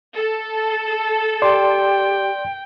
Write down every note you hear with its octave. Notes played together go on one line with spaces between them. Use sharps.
A4
G4 D5 G5 C6